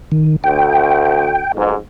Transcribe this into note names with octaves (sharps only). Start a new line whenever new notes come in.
D#3
D2 G5
B1 F2 G#2